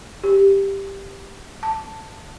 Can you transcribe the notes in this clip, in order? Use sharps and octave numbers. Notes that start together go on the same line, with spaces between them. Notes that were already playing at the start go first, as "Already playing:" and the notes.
G4
A5